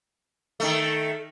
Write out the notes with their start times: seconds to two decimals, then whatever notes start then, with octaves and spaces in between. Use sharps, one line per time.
0.60 D#3 A3